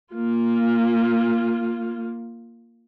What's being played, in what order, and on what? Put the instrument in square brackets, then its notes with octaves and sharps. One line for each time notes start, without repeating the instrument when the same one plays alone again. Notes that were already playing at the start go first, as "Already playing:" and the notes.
[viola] A#3 F4